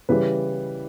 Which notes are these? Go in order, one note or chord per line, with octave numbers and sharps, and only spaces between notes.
C#3 E3 G3 B4